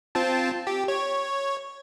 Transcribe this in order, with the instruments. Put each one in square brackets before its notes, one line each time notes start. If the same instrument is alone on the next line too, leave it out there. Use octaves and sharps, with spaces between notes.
[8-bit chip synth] C4 F4 A5
G4
C#5